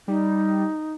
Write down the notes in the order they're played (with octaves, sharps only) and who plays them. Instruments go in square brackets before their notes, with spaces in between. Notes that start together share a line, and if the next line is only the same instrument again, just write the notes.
[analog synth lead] G3 [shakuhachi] D#4